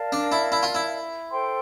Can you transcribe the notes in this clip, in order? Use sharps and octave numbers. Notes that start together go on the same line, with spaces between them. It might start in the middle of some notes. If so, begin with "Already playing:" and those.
Already playing: A#4 D5 F5 A5
D4
E4
E4
F4
E4
A4 C5 G5 C6